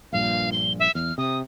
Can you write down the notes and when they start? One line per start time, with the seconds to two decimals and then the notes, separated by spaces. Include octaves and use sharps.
0.12 A#1 G2 A#2 F5
0.52 G7
0.79 E5
0.95 E2 F6
1.18 C3 D#6